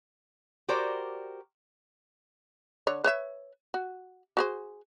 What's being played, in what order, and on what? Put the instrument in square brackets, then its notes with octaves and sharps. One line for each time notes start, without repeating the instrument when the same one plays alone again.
[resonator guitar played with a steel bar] F#4 G4 A#4 C5 D5 G5
[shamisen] D3 C#5
B4 C#5 E5
F#4
F#4 G#4 C5